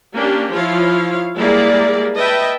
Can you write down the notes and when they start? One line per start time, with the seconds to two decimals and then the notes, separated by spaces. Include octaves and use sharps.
0.16 A#3 C#4 D4 G4
0.53 F3 E4 F4 C#5 F5
1.38 G3 G#3 A#3 E4 G#4 D5
2.17 B4 D#5 E5 G5 A5